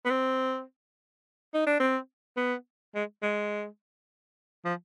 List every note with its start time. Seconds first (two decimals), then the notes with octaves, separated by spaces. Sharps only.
0.05 B3
0.10 C4
1.54 D#4
1.66 D4
1.80 C4
2.37 B3
2.95 G#3
3.22 G#3
4.65 F3